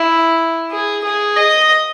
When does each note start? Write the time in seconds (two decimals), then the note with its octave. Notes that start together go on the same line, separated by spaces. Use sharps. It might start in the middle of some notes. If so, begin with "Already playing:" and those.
Already playing: E4
0.71 G#4
1.04 G#4
1.37 D#5